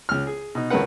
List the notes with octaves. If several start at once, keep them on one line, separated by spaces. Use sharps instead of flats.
C#2 F6
G#4
B2 D#4
G#1 C#2 C#3 A#4 B4 F#5